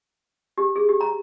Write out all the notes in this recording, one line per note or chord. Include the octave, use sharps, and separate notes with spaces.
G4
G#4
G4
A#5